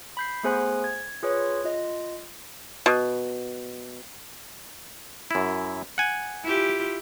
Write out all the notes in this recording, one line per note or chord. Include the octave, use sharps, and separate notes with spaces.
B5 G6 C7
A3 B3 G#4 C5 G#5 F#6
G#6
F4 G#4 B4 C#5
F4 D#5
B2
F#2 E4
F#5 G#5
E4 F4 G4